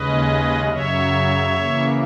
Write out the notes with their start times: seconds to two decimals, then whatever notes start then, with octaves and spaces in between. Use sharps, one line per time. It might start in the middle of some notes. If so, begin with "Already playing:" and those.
Already playing: D#2 C#3 G#3 C#4 B4 D#5
0.69 F#2 C#3 F#3 C#5 E5
1.54 C#3 E3 A#3